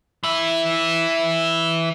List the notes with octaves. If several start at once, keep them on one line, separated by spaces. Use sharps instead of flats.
E3 E4